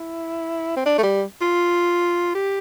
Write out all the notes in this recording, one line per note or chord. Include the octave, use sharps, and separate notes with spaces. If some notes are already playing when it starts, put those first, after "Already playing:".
Already playing: E4
C4
D4
A3
G3
F4
G4